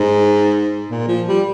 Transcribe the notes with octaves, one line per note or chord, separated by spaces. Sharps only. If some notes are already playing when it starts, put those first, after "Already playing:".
Already playing: G#2
A#2
F3
G3